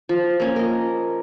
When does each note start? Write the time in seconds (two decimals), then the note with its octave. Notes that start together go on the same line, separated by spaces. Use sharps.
0.09 F3
0.40 A#3 C#4
0.56 A#4 D#5